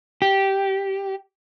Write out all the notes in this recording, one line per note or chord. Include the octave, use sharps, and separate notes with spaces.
G4